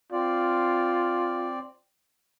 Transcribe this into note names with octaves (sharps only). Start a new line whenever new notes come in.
C4 F4 D5